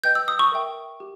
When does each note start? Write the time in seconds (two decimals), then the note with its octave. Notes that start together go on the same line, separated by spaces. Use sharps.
0.04 B4 D#5 G5 G6
0.15 E6
0.28 D#6
0.39 C#6
0.52 A#4 E5 G5
1.00 G4